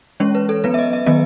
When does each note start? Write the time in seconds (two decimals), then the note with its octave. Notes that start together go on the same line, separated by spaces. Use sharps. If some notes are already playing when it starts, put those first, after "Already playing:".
0.20 E3 G#3 C#4 C#5
0.35 B4
0.49 A4
0.64 F#3 B3 B4
0.74 E5
0.79 D#5
0.93 E5
1.06 D#3 F#3 B3 D#5